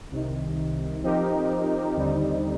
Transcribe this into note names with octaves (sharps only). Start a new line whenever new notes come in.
C2 C3 D#3
F3 C4 D#4 G4 A#4
D#2 D3 G3 C4 D#4